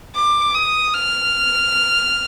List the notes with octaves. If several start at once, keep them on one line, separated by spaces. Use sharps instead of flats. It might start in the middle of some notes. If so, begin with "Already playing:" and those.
D6
D#6
F6